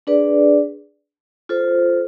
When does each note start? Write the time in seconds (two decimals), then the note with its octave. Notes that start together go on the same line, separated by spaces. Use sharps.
0.07 D4 G#4 B4 D5
1.49 F4 A4 C5